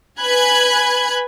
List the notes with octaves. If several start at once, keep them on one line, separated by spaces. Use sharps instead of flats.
B4 G#5 B5 F#6 G#6